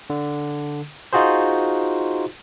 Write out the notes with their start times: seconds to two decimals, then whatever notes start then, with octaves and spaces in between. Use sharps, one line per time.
0.10 D3
1.13 D#4 F4 F#4 G#4 C5